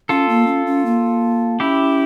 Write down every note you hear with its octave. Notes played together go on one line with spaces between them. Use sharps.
C#4 F4 A4
A#3
C#4
C#4
A#3
C#4 E4 G4